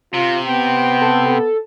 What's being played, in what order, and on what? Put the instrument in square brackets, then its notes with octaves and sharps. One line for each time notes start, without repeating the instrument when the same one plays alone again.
[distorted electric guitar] C3 [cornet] F4
[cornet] B3 [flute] G5
[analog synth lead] A4